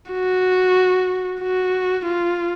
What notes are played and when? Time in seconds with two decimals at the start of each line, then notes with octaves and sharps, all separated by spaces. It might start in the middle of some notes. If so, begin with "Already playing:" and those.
0.12 F#4
1.41 F#4
2.06 F4